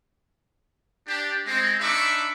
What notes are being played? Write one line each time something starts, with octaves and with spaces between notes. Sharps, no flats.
D4 G4
G#3 C4
D4 D#4 E5 B5 C#6 D6